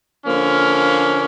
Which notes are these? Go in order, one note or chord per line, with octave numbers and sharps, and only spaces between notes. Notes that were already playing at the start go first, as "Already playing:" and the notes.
D3 F3 A#3 C#4